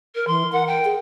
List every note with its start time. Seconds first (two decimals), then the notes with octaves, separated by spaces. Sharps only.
0.15 A#4
0.27 E3 C6
0.52 A#4 F#5
0.67 G5
0.85 G#4